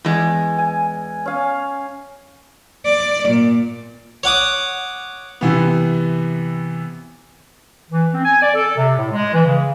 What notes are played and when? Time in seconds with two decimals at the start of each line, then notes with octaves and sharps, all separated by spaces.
0.05 E2 G#3
0.58 G#5
1.26 C#4 F5
2.83 D5
3.26 A#2
4.23 C#5 F#5 D6 D#6
5.41 C3 E3 B3
7.90 E3
8.13 C4
8.24 G#5
8.41 D5
8.54 A4
8.76 C3
8.97 A2
9.11 G#3
9.33 E3
9.46 C#3